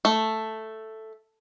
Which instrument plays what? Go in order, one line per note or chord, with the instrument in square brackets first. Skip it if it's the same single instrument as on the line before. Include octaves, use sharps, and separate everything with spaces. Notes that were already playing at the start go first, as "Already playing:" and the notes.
[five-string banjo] A3